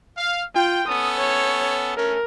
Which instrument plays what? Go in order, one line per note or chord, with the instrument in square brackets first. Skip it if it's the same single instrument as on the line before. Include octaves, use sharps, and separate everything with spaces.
[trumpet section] F5
[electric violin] F4 [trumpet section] G5
[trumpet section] B3 C#4 A4 [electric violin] D#6
[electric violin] C#5
[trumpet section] A3 C#4 [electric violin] A#4